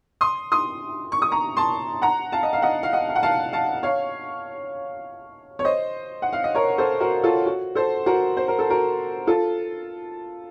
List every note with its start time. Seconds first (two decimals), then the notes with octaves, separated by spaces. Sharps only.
0.21 C6 D#6
0.52 C6 D#6
1.12 C#6
1.22 D#6
1.31 A#5 C#6
1.57 A5 C6
2.02 F#5 A#5
2.32 F5 A5
2.43 D#5
2.53 F5
2.62 D#5 F#5
2.83 F5
2.93 D#5 F#5
3.09 F5
3.16 F#5
3.23 F5 A5
3.53 F5 A5
3.83 C#5 F5
5.59 C#5
5.64 C5 D#5
6.22 F#5
6.33 F5
6.44 D#5
6.55 A#4 C#5
6.78 A4 C5
7.00 F#4 A#4
7.24 F4 A4
7.46 F#4
7.75 A4 C5
8.06 F#4 A#4
8.37 C5
8.48 A#4
8.59 A4
8.70 F#4 A#4
9.27 F4 A4